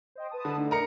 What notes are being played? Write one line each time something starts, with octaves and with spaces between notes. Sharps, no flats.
C5 D#5 G5
B4 A5 D#6
D3
A3 D4 D#4
A#4 A#5 C#7